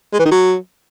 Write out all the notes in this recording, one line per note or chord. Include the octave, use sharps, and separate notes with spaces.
G#3
E3
D#3
F#3